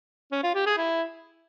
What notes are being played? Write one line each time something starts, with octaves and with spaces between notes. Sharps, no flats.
C#4
F4
G4
G#4
E4